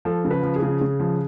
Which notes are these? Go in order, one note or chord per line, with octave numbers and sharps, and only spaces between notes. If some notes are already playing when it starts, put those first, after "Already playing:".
F3 A4
C#3
B4
F3
G#4
C#3
C#3
F3